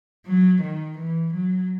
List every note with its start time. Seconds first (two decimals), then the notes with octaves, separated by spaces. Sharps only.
0.26 F#3
0.63 D#3
0.98 E3
1.34 F#3